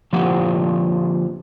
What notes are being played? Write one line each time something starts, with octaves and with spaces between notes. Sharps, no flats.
D3 F3 A#3 F4 G4 F#5